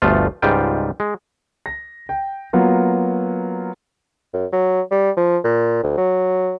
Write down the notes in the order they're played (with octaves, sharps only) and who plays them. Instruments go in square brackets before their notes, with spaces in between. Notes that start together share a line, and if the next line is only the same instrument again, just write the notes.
[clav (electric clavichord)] G1 D2 F3 A3 F4
C#2 G#2 G3 F4 G5
G#3
[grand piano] A#6
G5
F#3 A#3 B3 F4 F#4
[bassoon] F#2
F#3
G3
F3
A#2
D2
F#3